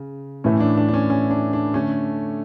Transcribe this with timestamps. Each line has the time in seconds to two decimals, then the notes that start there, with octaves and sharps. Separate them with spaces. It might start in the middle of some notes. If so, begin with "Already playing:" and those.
Already playing: C#3
0.44 A2 E3 A3 C#4
0.60 D4
0.77 D4
0.88 D4
0.94 C#4
1.10 C#4
1.31 D4
1.53 D4
1.74 D3 A3 C#4